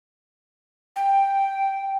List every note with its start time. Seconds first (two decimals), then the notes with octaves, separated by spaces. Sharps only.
0.96 G5